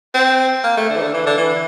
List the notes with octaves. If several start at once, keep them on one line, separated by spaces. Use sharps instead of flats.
C4
A#3
A3
D3
E3
D3
E3
D3
E3